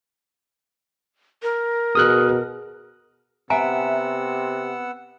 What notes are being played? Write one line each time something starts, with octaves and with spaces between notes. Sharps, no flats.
A#4
B2 G#4 D#6 F6 F#6
C3 B3 E5 F#5 G#5 A#5 E6